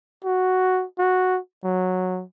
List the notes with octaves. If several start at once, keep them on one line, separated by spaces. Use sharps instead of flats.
F#4
F#4
F#3